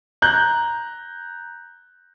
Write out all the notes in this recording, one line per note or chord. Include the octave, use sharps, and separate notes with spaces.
A#5 F#6 G6